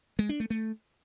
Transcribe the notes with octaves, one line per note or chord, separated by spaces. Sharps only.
G#3
D4
A3
A3